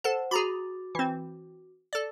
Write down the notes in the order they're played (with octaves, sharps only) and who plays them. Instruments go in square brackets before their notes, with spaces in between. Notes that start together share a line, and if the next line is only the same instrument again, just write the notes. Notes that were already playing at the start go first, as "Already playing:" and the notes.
[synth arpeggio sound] A4 A5 [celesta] C5 F#5
[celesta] F#4 D6 A6 [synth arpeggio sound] G#4 A#5 B5
[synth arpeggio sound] E3 C4
[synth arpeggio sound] A4 D5 [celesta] A6